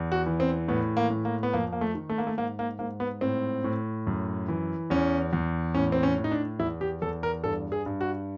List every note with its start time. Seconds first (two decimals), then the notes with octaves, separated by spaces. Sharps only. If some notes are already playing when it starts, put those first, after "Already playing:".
Already playing: E2
0.12 F#4
0.26 E3
0.40 C4
0.68 A2 B3
0.97 A#3
1.10 A2
1.25 A#3
1.43 B3
1.53 F2 A#3
1.72 A#3
1.81 A3
1.95 D#3
2.09 A3
2.18 A#3
2.27 A3
2.37 G#2 A#3
2.59 A#3
2.79 G#2 A#3
3.00 B3
3.21 A2 C4
3.64 A2
4.07 F#2
4.48 E3
4.90 E2 C#4
5.33 E2
5.75 A2 C#4
5.92 C4
6.03 C#4
6.18 A2
6.24 D#4
6.31 D4
6.59 E2 E4
6.81 G4
7.02 E2 A4
7.23 A#4
7.44 G2 A4
7.72 G#4
7.86 G2
8.01 F#4